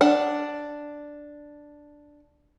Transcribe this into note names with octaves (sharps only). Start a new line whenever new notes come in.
D4 F#5